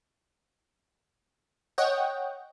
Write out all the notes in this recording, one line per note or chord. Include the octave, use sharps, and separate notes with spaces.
C#5 D#5 F#5 G5